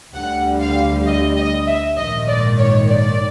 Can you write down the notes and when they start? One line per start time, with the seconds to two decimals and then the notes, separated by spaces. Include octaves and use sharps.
0.14 D2 D3 G3 F#5
0.60 F5
1.06 D#5
1.36 D#5
1.66 E5
1.96 A#1 G#2 D#3 D#5
2.27 D5
2.58 C#5
2.88 D5